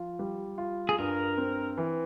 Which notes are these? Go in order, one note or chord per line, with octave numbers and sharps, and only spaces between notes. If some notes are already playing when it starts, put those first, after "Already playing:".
Already playing: F3 F4
G3
F4
G#4
G2 A#4
C4
E3